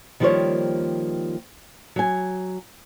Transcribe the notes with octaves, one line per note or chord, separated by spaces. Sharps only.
D#3 F3 G3 A#3 C5 C#5
F#3 G#5